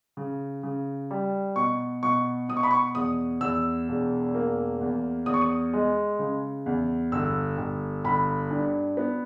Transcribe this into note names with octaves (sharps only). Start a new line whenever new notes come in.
C#3
C#3
G3
B2 C#6
B2 C#6
B2 D#6
C#6
B5
C#6
E2 D#6
E2 E6
E1
A#3
E2
E2 D#6
C#6
D#6
G#3
C#3
E2
G1 E6
G1
G1 B5
G2
B3